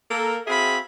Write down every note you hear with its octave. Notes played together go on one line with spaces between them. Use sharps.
A#3 A4 A#4
C4 F#4 G#4 E5 F5 B5